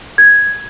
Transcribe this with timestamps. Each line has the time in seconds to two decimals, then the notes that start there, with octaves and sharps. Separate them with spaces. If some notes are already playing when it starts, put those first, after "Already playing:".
0.18 G#6